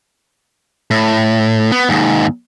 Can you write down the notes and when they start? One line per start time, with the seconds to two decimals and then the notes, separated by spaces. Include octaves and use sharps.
0.91 A2
1.72 B3
1.89 D#2 G#2